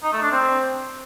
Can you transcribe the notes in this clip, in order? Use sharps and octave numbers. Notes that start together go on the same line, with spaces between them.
D#4
A3
D4
C4